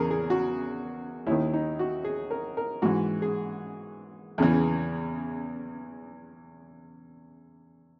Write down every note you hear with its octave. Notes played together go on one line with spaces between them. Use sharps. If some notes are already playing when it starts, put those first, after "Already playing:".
Already playing: E2 C#3 E3 G#4 A#4
G#4
F#4
D#2 D#3 E4
D#4
F#4
G#4
A#4
A#4
G#2 E3 F#4
G#4
E2 C#3 E3